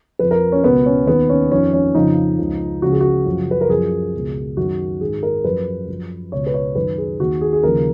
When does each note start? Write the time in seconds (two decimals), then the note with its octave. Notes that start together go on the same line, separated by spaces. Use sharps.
0.19 F2 F3 B4
0.31 A#4
0.52 C#4
0.64 C#2 B2 B3
0.86 C#4
1.07 D#2 D#3 B3
1.29 C#4
1.51 F2 D#3 C#4
1.74 C#4
1.95 F2 C#3 F3 D#4
2.39 C#2 C#3 F3
2.82 C#2 C#3 F3 F#4
2.92 G#4
3.01 F#4
3.26 F#2 C#3 F3
3.51 B4
3.61 A#4
3.69 F#2 F3 G#4
4.14 C#2 B2
4.57 F#2 D#3 F#4
5.01 G#2 D#3 G#4
5.23 A#4
5.45 F#2 F3 B4
5.88 F#2 F3
6.32 C#2 B2 C#5
6.47 B4
6.54 C#5
6.75 F#2 D#3 B4
6.98 G#4
7.20 D#2 D#3 F#4
7.41 G#4
7.53 G#4
7.63 D#2 C#3 F3 A#4